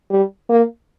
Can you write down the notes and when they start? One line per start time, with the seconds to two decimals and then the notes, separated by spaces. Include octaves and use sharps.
0.10 G3
0.50 A#3